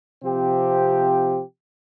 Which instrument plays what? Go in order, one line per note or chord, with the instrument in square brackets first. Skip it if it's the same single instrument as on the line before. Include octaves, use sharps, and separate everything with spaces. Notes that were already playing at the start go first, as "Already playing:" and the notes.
[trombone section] C3 F3 C4 G4